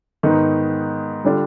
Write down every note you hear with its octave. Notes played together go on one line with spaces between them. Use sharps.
G#2 D#3 B3 D#4
D3 G3 D4 F4